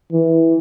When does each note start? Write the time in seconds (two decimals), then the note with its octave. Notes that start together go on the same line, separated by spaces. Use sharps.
0.13 E3